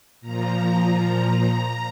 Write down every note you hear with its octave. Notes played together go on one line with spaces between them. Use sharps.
A#2 F3 A#5